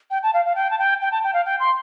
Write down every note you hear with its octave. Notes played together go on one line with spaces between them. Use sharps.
G5
A5
F5
F5
G5
A5
G5
G5
A5
G5
F5
G5
C6